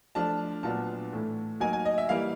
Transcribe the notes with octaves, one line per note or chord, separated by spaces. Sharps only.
F3 A3 D4 F4 A5
A#2 F#3 B3 D4 F4 A5
A2 E3 A3
F#3 A#3 D#4 G#5
G#5
D#5
E5
E3 G3 A#3 F5